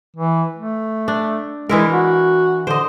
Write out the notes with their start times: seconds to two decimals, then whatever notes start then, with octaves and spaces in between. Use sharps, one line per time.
0.16 E3
0.56 A3
1.08 D4
1.69 E3 G#3 E4 A#4
1.92 F#4
2.67 D3 C5 D#5